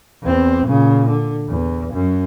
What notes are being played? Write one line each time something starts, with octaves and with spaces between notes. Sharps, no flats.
E2 C4
A#2 C#3
D3
E2
F#2